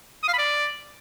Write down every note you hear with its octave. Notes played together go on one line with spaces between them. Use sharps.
D#6
F5
B5
D5